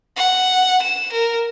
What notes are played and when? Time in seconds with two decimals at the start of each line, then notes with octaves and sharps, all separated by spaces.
0.16 F#5
0.82 E7
1.12 A#4